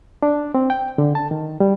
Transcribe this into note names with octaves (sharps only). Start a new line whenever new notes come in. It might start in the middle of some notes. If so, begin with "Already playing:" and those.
D4
C4
G5
D3
A5
D#3
G3